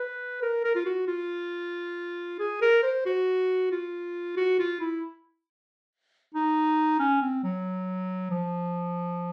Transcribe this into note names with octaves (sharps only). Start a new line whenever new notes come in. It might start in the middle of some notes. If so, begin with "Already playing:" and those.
Already playing: B4
A#4
A#4
F4
F#4
F4
G#4
A#4
C5
F#4
F4
F#4
F4
E4
D#4
C#4
C4
F#3
F3